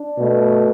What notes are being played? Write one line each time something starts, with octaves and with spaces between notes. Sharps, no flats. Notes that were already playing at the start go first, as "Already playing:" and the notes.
Already playing: D4
B2 A3